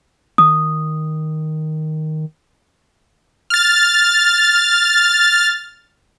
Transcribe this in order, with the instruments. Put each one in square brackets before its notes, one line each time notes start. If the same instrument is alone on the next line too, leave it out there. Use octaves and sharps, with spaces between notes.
[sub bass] D#3 [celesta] D#6
[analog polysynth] F6 A6